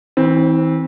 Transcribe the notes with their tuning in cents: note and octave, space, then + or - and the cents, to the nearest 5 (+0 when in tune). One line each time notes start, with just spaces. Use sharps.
E3 -35 C4 +0